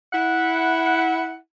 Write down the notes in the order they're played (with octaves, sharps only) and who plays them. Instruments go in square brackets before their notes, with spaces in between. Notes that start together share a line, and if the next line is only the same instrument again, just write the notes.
[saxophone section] E4 F#5